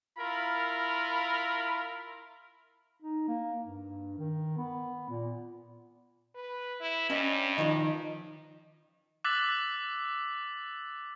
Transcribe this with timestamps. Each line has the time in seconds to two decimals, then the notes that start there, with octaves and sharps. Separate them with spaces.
0.18 E4 F4 A#4 B5
3.02 D#4
3.28 A#3
3.64 G2
4.18 D#3
4.57 B3
5.10 A#2
6.35 B4
6.81 E4
7.10 G2 C#4 D#5
7.58 D#3 F3
9.24 D6 E6 F#6 A6 B6 F#7